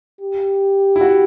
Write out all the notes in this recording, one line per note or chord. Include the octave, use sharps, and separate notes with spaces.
G4
E4
F#4